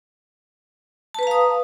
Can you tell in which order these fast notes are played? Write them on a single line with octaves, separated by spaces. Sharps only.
A5 B4 A#5 F5 D#6